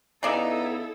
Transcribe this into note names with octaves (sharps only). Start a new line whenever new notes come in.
C#3 B3 D#4 E4 A4 D5 E5